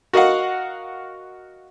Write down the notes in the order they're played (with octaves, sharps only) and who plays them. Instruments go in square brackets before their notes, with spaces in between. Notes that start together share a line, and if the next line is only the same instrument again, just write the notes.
[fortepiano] F#4 A#4 D#5 F5 F#5